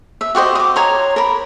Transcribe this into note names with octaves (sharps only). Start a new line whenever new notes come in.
E5
F#4 G4 C5 D#5
D6 D#6
C#5 A#5 C6
A#4 B5